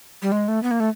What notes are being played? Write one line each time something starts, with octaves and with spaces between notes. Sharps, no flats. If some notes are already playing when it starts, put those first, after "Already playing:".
G3
G#3
A3
B3
A#3
A3